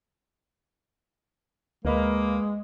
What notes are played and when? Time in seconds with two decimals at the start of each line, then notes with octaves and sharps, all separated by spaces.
1.85 D2 G#3 A#3 B4 D#5 B5